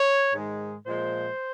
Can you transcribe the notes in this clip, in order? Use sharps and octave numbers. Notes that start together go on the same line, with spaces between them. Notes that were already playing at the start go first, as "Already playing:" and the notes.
Already playing: C#5
G#2 D#3 G#3
A#2 F3 G#3 C5